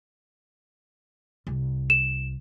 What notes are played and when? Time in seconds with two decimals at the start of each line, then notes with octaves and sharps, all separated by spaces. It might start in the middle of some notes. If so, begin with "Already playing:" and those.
1.47 C2
1.90 E7